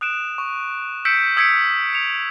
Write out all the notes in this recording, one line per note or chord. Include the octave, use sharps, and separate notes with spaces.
D#6 F#6 D7 E7
C#6
E6 G6 B6 C#7 D7 E7
D#6 E6 G#6 B6 C#7 D7
C#7 F7